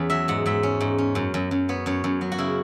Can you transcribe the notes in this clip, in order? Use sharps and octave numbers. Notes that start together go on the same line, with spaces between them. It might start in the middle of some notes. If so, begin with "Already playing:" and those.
Already playing: E2 C#4 B4
F#3 E5
G#2 F#5
G#2 E5
C#4
G#2
C#4
F#2
F#2
F#2
B3 C#5
F#2 C#5
F#2
F#3
F#4
C#3 E4